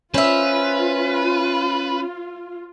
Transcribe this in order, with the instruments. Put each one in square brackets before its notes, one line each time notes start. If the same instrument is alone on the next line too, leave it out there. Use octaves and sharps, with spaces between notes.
[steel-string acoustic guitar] C#4 [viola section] F4 [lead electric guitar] B4 [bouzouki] C5 E5